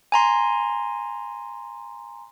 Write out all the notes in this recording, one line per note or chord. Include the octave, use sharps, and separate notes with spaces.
G#5 A#5 C6